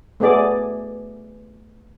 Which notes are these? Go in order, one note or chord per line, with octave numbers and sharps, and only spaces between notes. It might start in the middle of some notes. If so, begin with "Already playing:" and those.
A3 B3 G#4 D5